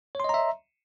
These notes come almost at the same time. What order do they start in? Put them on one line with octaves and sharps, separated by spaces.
C#5 C6 D#5 A#5 E5